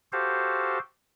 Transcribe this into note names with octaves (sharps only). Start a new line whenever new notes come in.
F#4 G4 A4 C5 F5